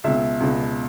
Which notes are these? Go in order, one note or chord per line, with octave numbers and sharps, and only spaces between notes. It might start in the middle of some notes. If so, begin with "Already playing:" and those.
C#2 B2 E5
C#2 B2